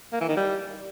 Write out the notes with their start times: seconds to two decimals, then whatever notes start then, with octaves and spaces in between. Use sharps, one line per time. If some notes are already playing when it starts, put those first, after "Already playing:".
0.13 A#3
0.21 E3
0.29 D#3
0.37 G3